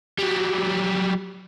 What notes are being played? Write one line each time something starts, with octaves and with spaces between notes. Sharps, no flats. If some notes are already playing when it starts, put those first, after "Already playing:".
F#3 G3